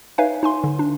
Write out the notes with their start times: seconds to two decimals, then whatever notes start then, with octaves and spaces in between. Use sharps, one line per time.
0.18 D#4 B4 C#5 E5 F5 G#5
0.43 D#4 G#5 C6
0.64 D3
0.79 D4